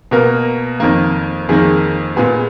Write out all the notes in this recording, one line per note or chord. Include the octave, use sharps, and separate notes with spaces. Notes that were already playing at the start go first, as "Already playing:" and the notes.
B2 A#3 A#4
F2 D#3 A#3
F2 D#3 A#3 G#4
A#2 G#3 B3 G#4